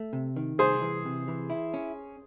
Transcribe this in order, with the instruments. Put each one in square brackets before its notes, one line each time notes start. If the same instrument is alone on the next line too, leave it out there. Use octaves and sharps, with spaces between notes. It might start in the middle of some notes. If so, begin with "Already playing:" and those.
Already playing: [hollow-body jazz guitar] A3
C3
D#3
[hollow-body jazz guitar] C2 [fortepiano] G#4 C5
[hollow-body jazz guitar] E3
C3
E3
E4
C#4